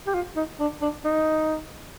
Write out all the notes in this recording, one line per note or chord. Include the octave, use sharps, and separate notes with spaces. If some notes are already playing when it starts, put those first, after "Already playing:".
G4
F4
D#4
D4
D4
D#4